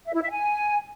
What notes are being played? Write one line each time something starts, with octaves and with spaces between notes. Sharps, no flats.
E5
E4
E5
G#5